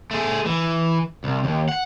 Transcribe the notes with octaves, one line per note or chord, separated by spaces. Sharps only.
A3 G#4
E3
C2
D#2
F#5